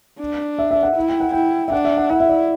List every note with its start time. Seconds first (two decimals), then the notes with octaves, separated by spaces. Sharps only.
0.19 D4
0.59 E5
0.71 E5
0.83 F#5
0.96 E4
1.09 G5
1.20 F#5
1.32 E4 G5
1.68 E5
1.72 D4 F#5
1.85 E5
1.97 F#5
2.10 E4 F#5
2.20 E5
2.29 D5